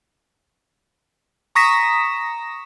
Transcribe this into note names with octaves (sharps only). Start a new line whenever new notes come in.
A#5 C#6 D#6 A#6 B6 E7